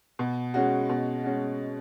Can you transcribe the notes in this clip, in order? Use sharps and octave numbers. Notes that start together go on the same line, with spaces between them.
B2
G#3 C#4 F#4
B2
G#3 C#4 F#4